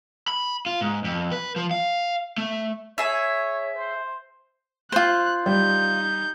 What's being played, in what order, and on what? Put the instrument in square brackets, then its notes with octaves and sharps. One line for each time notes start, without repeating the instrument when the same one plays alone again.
[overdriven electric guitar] B5
F4
G#2
F2
B4
F3
F5
A3
[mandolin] G#4 E5 [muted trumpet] C#5
[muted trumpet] C5
[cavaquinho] F4 C5 [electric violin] F#6
[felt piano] G3 [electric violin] D#4 G6